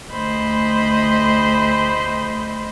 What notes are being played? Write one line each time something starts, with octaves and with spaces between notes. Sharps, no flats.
D2 A3 C5 D#5 B5